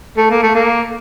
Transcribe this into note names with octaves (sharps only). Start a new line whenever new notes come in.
A3
A#3
A3
A#3